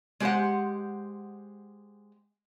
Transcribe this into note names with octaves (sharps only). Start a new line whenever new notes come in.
G#3 G4 B4 C5 F#5